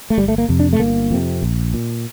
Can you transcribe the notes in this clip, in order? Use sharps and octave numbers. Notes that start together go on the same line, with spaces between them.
A3
G1 G3
A3
A#3
F2 C3
D4
A3
G1 A#3
F2 C3
A#1
A#2